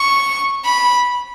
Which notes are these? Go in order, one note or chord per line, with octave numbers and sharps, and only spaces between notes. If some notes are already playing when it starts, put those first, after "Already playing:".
Already playing: C#6
B5